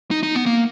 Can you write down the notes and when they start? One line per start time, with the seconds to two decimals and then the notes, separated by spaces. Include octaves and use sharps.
0.11 D#4
0.23 D#4
0.35 B3
0.46 A#3